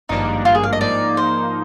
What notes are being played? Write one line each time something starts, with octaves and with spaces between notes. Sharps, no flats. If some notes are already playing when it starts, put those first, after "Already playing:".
G#1 G2 F3 A#3 D4 D#4
F4
G#4
F5
D#5
G#2 F3 A#3 D#4 D5
C5